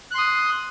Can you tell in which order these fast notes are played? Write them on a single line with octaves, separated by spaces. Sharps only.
F#6 C6 D#6